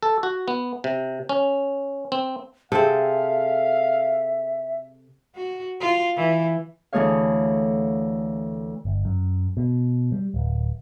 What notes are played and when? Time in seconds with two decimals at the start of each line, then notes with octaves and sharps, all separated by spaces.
0.03 A4
0.23 F#4
0.48 B3
0.84 C3
1.29 C#4
2.12 C4
2.72 C3 C4 G#4 A4 E5 F5
5.35 F#4
5.80 F4
6.17 E3
6.93 D2 E3 A3 G#4 C#5 F5
8.85 G1
9.05 F#2
9.57 B2
10.12 G3
10.34 D1